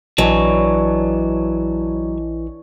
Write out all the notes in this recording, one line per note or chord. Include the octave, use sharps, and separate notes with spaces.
A#1 E3 F#3 D4 C#5 D#5 A5